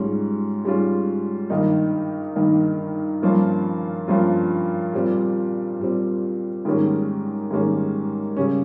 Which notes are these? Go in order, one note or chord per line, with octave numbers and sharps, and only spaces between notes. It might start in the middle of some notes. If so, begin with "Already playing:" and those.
Already playing: G#2 G3 C#4 F4
G#2 G3 C#4 F4
G2 D#3 A#3 D#4
G2 D#3 A#3 D#4
G2 F3 A#3 C#4 F4
G2 F3 A#3 C#4 F4
A#2 G3 C4
A#2 G3 C4
G#2 D#3 G3 A#3 C#4
G#2 D#3 G3 A#3 C#4
C#3 G3 C#4